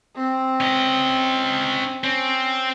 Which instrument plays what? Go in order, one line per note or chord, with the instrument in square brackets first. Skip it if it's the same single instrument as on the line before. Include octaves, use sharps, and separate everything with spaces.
[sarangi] C4
[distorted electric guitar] C#4 D#5
[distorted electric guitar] C4 [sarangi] C#4